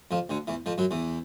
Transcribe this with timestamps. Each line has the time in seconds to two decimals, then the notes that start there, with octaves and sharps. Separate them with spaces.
0.11 F2 F3
0.29 D2 D3
0.47 E2 E3
0.66 F2 F3
0.78 F#2 F#3
0.91 E2 E3